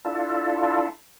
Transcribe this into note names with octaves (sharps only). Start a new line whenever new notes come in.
D4 E4 F4 A4